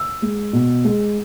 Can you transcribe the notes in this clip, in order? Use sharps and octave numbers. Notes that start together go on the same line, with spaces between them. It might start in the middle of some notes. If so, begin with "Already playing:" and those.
Already playing: E6
G#3
B2
G#3